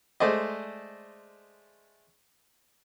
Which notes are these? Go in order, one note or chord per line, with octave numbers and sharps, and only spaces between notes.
G#3 A3 C5 D5 D#5